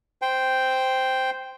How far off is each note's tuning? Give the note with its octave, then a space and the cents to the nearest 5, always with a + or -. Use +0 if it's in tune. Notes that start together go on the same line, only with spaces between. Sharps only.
C5 -5 G5 +0